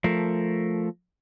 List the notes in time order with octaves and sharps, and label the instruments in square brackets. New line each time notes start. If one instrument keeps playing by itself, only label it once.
[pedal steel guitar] F3 A3 A#4